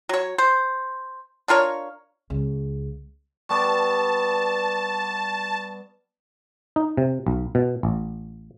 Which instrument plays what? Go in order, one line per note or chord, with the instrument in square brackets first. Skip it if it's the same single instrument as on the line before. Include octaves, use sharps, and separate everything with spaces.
[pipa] F#3 C#5
C5
D4 F4 A#4 C#5
[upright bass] C#2
[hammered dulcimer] G3 B3 D5 [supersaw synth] A5 [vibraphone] C#6
[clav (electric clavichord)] D#4
C3
B1
B2
A1